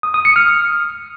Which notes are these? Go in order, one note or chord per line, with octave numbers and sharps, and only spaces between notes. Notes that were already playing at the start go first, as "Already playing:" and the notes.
D#6
D#6
C#7
F6